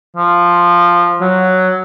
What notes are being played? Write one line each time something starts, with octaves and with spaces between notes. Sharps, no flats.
F3
F#3